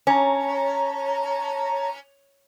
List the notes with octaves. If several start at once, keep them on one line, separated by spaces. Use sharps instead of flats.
C#4 C#5 A5 A#5